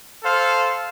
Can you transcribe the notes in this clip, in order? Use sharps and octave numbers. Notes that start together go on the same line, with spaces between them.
A4 C5 F5